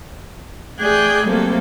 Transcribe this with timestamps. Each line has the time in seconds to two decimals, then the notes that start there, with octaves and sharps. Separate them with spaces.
0.79 A3 G#4 D5 G5 F#6 G6
1.27 F#3 G3 A3 A#3 C4 A4